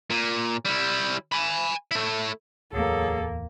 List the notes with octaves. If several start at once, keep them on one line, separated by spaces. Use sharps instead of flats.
A#2
G3 E4
G#5 B5
A3 E4
D1 E2 F#3 A#3 G#4 A4